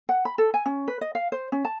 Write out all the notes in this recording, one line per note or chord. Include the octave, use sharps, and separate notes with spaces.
F#5
B5
A4
G#5
C#4
B4
D#5
F5
C5
C#4
A5